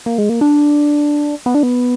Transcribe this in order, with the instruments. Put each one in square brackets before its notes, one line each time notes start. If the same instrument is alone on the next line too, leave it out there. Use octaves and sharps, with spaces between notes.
[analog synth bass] A#3
G#3
A#3
D4
B3
D4
B3